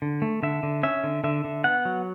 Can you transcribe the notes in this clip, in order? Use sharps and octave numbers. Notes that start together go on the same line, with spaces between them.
D3
A3
D3 E5
D3
C#4 E5
D3
D3 E5
D3
B3 F#5
F#3